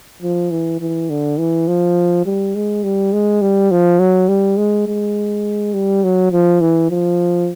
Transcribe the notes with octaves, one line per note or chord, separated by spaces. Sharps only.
F3
E3
E3
D3
E3
F3
G3
G#3
G3
G#3
G3
F3
F#3
G3
G#3
G#3
G3
F#3
F3
E3
F3